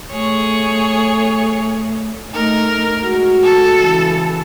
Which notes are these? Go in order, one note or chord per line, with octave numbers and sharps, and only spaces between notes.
A3 G#4 C#5
A3 D#4 A#4
G#3 F#4
A4
C#3 E3